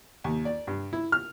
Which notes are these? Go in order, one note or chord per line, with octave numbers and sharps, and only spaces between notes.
D#2
D5
G2
E4
F6